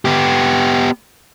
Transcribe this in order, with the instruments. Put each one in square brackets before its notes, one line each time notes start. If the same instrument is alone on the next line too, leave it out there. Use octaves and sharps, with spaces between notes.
[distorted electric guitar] B3 G4